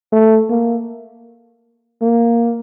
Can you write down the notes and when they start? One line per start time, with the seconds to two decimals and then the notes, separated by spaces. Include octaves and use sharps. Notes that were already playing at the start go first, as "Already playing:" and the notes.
0.12 A3
0.50 A#3
2.02 A#3